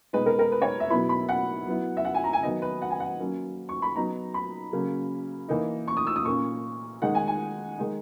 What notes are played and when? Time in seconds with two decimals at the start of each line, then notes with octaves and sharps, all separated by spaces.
0.13 B2 G#3 D#4 B4
0.26 A#4
0.39 A#4
0.52 B4
0.62 C#5
0.80 E5
0.90 B2 F#3 B3 E4 B5
1.09 B5
1.29 F#5
1.67 F#3 B3 E4
1.97 E5
2.05 F#5
2.14 G#5
2.24 A#5
2.33 G#5
2.43 D#3 F#3 B3 D#4 D#5
2.62 B4
2.82 F#5
2.90 G#5
3.00 F#5
3.20 F#3 A#3 C#4
3.69 C#6
3.82 B5
3.96 F#3 B3 D#4 A#5
4.34 B5
4.72 C#3 F#3 A#3 C#4
5.49 E3 A#3 D#4
5.88 C#6
5.97 D#6
6.07 E6
6.16 D#6
6.25 A#2 A#3 C#4 C#6
7.02 D#3 G#3 D#4 F#5
7.15 G#5
7.27 G#5
7.78 D#3 G#3 D#4